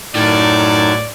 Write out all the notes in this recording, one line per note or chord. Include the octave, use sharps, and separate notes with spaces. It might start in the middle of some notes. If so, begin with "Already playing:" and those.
F#2 A2 D#3 D5 A5 G#6